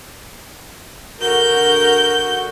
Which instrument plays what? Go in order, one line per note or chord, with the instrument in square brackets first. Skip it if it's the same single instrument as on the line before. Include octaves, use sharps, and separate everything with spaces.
[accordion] D3 F#4 [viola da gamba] A#4 [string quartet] G6